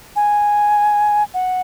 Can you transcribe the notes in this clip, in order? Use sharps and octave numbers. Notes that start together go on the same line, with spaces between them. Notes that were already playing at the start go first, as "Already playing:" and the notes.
G#5
F#5